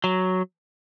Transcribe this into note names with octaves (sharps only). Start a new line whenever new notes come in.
F#3